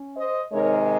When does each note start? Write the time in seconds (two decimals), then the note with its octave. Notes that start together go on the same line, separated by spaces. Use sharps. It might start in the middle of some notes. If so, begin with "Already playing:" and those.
Already playing: C#4
0.17 C5 D#5
0.52 C3 D#3 G#3 D#4 A#4 C#5